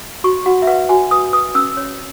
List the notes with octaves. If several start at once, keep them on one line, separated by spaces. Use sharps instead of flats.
F#4 C#6
F#4 F#5
E5
B4 F#5
F#4 G#5
B4 D#6
B4 D#6
C#4 E6
C#5